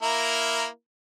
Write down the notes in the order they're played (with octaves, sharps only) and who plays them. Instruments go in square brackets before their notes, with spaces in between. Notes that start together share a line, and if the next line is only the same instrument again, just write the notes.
[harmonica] A#3 E4 A#4